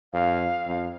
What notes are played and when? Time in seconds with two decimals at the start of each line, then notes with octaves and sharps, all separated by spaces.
0.13 F2 F5
0.66 F2